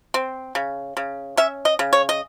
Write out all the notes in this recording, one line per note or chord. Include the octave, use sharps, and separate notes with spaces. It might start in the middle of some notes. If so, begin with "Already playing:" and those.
C4
C#3
C#3
C#4 E5
D#5
C#3
C#5
D#5